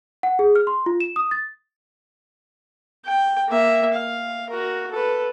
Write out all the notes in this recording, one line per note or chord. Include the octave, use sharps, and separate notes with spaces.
F#5
G#4
F6
C6
F4
E7
D#6
A6
G5
A#3 E5
F5
F#4 A#4
A4 B4